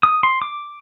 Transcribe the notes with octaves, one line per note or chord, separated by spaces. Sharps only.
D#6
C6
D6